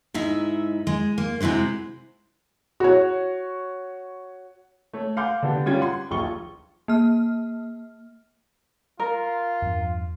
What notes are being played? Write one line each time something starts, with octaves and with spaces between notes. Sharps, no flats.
G#2 D#4 E4 E5
G#3
A#3
C3 G#3 E4 F#4 C5
F#4 C#5
A3 C#5
F5 F#5 G#5 C6 D6 G6
D3 B3 D4 G4
G3 C#4 F4 G5 G#6
F#5 C6
D#1 A#1 F4 C#6 G7
A#3 F6
F4 A#4
E2 G2 F3